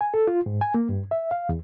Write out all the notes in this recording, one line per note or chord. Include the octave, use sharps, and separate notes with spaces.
G#5
A4
F4
G#2
G#5
A#3
G2
E5
F5
E2